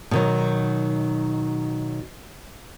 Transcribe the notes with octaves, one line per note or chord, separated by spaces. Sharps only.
B2 D#3 F#3